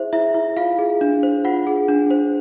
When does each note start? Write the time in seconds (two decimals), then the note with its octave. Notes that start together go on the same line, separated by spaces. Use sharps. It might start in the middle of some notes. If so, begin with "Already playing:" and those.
Already playing: E4 G#4 C5 E5
0.13 E4 E5
0.35 E4
0.57 F4 F5
0.78 G#4
1.01 D4
1.23 C5
1.45 F4 F#5
1.67 G#4
1.88 D4
2.11 C5